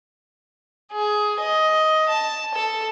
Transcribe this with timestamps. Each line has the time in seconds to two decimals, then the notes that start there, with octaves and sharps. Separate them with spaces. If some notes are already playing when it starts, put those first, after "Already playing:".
0.92 G#4
1.40 D#5
2.09 A5
2.54 A4